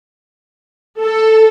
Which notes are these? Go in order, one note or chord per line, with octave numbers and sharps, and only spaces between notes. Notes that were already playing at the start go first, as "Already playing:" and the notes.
A4